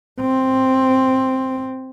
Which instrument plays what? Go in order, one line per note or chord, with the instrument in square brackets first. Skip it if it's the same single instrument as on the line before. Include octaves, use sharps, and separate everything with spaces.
[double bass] C4